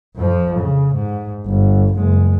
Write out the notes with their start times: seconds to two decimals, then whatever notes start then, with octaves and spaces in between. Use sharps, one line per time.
0.16 F2 F3
0.59 C#3
0.95 G#2
1.45 G1
1.94 F#1 G#3